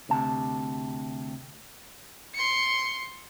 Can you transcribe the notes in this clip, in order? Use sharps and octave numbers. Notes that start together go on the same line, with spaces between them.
D2 C3 A5
C6 C#7